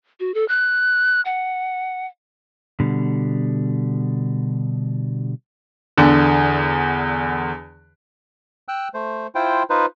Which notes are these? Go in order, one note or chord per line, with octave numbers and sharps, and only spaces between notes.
F#4
A4
F#6
F#5
B2 D3 G3
E2 D3
G5 E6 F#6
A3 C5
E4 F4 C5 G5
D#4 F4 B4 C5